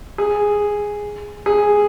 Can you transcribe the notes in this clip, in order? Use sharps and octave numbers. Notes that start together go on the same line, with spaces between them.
G#4
G#4